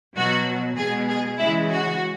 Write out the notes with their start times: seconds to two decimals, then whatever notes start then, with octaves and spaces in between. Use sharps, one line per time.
0.16 B2 F#3 F#4
0.77 B2 G#3 G#4
1.08 G#4
1.38 C#3 E3 G#3 E4
1.70 F#4